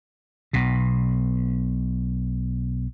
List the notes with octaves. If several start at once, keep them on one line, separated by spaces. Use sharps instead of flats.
B1 B2